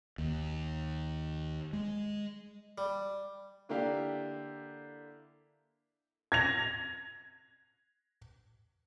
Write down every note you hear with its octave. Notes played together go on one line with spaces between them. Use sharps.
D#2
G#3
G3
D3 A#3 D4 E4 G4 F5
G#6 A#6 F7